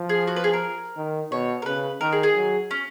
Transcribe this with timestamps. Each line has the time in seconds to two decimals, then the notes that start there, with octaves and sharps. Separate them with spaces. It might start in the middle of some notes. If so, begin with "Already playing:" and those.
Already playing: F3
0.09 G#4
0.27 F#4
0.36 B4
0.44 G#4
0.53 A#4
0.97 D#3
1.31 B2 C#5
1.62 A#4
1.65 C#3 B4
2.01 D#3 A#4
2.12 G#4
2.23 G#4
2.36 F#3
2.71 C#4